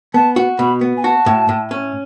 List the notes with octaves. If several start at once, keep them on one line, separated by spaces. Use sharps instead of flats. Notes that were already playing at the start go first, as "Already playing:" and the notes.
B3 A5
F#4
B2 B5
B3
G#5
F#4 A5
A2
A2
C#4